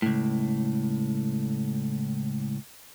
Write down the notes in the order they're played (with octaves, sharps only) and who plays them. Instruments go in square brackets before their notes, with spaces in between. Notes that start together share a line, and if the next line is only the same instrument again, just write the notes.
[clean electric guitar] C#2 A2